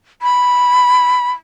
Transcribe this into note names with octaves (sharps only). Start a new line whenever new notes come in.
B5